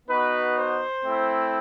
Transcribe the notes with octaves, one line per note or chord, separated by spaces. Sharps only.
B3 D#4 F#4 B4
C5
A3 C4 E4